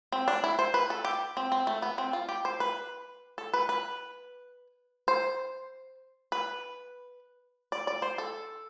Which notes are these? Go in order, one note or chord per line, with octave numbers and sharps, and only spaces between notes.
C4
D4
E4
C5
B4
A4
G4
C4
C4
A3
B3
C4
F4
G4
C5
B4
A4
B4
B4
C5
B4
D5
D5
C5
A4